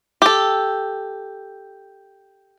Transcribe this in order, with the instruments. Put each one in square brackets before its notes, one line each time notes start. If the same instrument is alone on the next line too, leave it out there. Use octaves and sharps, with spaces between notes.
[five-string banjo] G4 A4